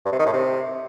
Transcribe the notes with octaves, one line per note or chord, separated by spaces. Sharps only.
G2
C3
D#3
A2
C3